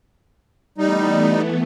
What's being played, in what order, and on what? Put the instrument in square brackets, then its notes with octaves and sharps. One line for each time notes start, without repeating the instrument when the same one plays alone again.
[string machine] E3 A3 B3 [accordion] G3 D#4